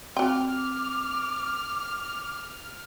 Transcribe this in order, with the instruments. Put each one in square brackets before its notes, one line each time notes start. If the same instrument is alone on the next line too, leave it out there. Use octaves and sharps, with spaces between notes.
[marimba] C4 [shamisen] F#4 G5 [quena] D6 [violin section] F6